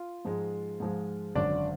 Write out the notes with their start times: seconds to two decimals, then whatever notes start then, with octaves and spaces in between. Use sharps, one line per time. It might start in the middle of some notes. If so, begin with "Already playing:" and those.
Already playing: F4
0.25 G#2 F3 G#3
0.80 G#2 F3 G#3
1.35 G#1 F#2 D3 D4 D5